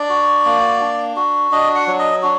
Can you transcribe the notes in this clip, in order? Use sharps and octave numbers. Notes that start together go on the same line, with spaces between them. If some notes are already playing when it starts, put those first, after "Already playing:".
Already playing: D4 D5
F#4
A#3
D4
F#4
D4 D#5
F#5
F#3
D#5
D4 F#4